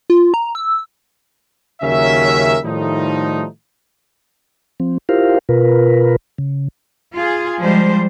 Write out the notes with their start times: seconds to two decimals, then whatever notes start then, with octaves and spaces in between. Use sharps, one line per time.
0.10 F4
0.34 A#5
0.55 E6
1.82 D#2 C#3 F#3 C#4 A#4 E5
2.64 A2 D#3 F3 G3 A3 D#4
4.80 F3 C4
5.09 E4 F4 G4 A#4 C5 F5
5.49 B2 F4 A#4 B4
6.38 C#3
7.14 F4 G#4
7.61 F3 G3 G#3 C5